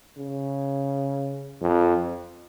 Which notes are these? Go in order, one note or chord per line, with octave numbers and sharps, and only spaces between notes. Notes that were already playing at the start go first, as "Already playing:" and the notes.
C#3
F2